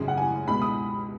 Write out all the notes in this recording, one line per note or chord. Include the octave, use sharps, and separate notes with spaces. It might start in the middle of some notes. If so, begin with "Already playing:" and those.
Already playing: G#1 F#2 C#3 G#3
F#5
G#5
C#2 B2 G#3 B5
D#6